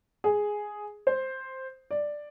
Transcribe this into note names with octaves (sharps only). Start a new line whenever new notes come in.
G#4
C5
D5